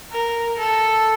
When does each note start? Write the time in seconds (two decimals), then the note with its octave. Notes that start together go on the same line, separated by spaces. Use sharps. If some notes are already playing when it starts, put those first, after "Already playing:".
0.11 A#4
0.58 A4